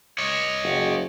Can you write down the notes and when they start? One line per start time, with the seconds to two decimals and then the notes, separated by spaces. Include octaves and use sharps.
0.18 C#5 D#5
0.63 F#1